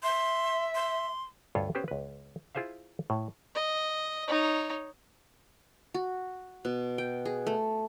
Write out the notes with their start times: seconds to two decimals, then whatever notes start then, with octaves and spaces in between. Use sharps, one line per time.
0.03 E5 C6
0.75 C6
1.55 D2 G2 F4 A4 C#5 E5
1.75 B3 C#4 G4 B4 C5
1.88 C#2 B4
2.55 E4 F4 G#4 C5 E5 F5
3.10 A2
3.55 D#5
4.28 D#4 C#5
5.94 F#4
6.65 B2
6.98 G5
7.25 G#4
7.47 A3